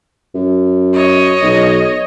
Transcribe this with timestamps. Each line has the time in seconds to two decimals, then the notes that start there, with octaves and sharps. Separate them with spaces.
0.35 F#2
0.93 C#5 D#5
1.43 B1